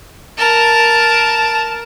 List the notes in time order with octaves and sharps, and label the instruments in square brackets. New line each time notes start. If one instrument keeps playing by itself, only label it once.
[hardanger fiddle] A#4 A5